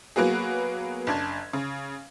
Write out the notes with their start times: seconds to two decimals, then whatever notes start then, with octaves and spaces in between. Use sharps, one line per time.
0.16 F#3 A#3 B3 F#4 G#4
1.07 F#1 D4 G#6
1.53 C#3